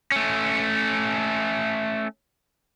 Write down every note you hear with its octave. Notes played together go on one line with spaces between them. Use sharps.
A3 C#4